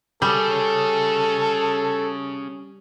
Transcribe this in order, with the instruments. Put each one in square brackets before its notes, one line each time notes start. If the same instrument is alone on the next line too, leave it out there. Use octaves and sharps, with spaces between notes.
[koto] G3 [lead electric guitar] C#4 G#4 [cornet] A4